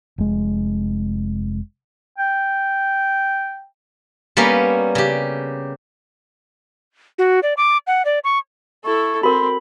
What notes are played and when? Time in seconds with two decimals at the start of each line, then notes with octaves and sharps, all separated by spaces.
0.18 F1 G#3
2.17 G5
4.37 G3 A#3 B3 C#4
4.95 C#3 G4
7.18 F#4
7.43 D5
7.57 D6
7.87 F#5
8.05 D5
8.24 C#6
8.85 E4 A4 C#6
9.23 C4 F#4 A#4 B5 C6